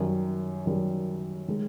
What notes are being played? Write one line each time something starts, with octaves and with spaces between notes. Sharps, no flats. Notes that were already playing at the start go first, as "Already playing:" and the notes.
Already playing: F#2 D#3 G3
F#2 D#3 G3
D#3 G#3